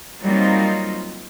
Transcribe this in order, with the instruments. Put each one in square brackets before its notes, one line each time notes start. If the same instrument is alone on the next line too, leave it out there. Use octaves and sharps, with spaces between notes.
[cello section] F#3 G3 A#3 C4 D#4 F4